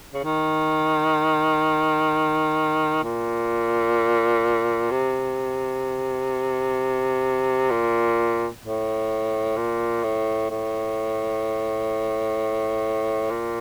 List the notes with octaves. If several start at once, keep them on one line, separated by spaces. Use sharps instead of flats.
C#3
D#3
A#2
C3
A#2
A2
A#2
A2
A2
A#2